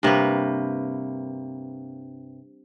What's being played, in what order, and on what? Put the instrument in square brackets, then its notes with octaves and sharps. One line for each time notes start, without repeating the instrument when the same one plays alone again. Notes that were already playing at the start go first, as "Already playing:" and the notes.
[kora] G2 C3 A#3 B4